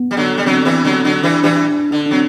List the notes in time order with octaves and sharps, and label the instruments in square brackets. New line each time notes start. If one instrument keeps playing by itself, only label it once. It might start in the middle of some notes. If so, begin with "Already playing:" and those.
Already playing: [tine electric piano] B3
[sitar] G3
D3 F#3
G3
[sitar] D3 F#3 [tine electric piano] C4
[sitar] E3 G3
D3 F#3
[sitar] D3 F#3 [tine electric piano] D4
[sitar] E3 G3 [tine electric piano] D4
[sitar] E3 G3 [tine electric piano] D4
[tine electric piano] D4
[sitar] D3 [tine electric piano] D4
[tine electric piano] D4
[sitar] F#3 [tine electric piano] C4